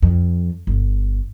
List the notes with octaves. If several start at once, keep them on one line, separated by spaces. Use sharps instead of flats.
F2
G1